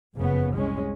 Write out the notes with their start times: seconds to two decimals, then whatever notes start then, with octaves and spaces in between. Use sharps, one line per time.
0.15 F#1 F2 C#3 B3
0.53 C2 G#3 C#4